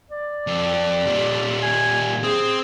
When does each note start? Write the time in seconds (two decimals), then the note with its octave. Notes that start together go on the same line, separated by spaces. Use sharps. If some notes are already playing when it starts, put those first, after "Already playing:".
0.11 D5
0.47 F2
1.07 A#2 G3
1.62 G#5
2.23 C4 G#4